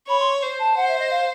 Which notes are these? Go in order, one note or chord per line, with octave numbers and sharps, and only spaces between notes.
C#5 B5
C6
C5
A5
C5 F#5
E5
D#5
F5